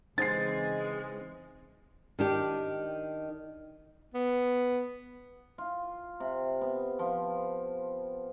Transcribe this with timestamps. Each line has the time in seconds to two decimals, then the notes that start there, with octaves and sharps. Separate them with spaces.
0.18 C#3 E3 G#3 C4 D#4 C5 A6 C7
2.19 D#3 D4 G4
4.14 B3
5.58 F4
6.20 C3
6.61 B3
6.99 F3